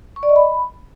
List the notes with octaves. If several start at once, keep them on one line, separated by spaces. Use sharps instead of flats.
C#6
D5
D#5
B5